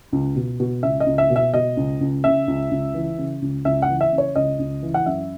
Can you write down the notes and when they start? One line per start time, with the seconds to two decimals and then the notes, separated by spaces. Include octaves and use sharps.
0.12 C#2
0.36 B2
0.60 B2
0.83 C#2 E5
1.00 D#5
1.06 C#2
1.18 E5
1.30 B2
1.36 E5
1.54 B2 D#5
1.77 C#2
2.01 C#2
2.24 C#3 E5
2.48 C#2
2.71 C#2
2.94 E3
3.18 C#3
3.42 C#2
3.65 C#2 E5
3.82 F#5
3.89 E3
4.01 E5
4.12 C#3
4.18 C#5
4.36 C#2 D#5
4.59 C#2
4.83 E3
4.94 F#5
5.06 F#2 E5